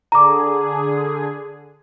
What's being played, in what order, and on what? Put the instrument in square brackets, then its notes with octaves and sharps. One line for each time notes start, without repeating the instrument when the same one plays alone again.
[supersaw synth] D3 G#4 [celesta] A#5 D6